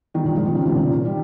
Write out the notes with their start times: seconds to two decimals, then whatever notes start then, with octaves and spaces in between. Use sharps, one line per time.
0.14 D#3 G3
0.24 G2 A#2
0.35 F3 G#3
0.45 D#3 G3
0.55 C#3 F3
0.66 C3 D#3
0.75 A#2 C#3
1.05 D#3 G3